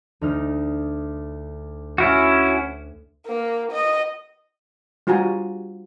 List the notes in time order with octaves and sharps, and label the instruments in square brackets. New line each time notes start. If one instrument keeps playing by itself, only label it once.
[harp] D2 D#4 F6
[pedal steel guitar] C#4 E4 F#4
[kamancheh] A#3
D#5
[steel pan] G3 F4 F#4 G#5 A#5